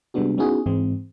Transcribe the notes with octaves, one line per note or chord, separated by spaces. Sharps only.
C3 G3 G#3 B3 D4 F#4
B3 C#4 D#4 E4 F#4 G#4
G#2 E3 G#3 C4